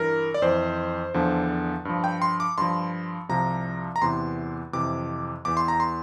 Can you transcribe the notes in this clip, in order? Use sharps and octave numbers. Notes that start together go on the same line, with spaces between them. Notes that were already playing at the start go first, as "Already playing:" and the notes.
Already playing: G2 E3 A#4
D5
F2 E3 C5
E2 D3 F3
G2 F3
G5
C6
D6
G2 F3 C6
C2 C3 F3 A#5
A#5
E2 C3 E3 C6
F2 C3 E3 D6
E2 E3 D6
C6
A#5
C6